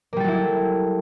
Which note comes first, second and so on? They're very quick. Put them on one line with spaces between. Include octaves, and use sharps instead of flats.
A#3 G3 A4 F#3 E4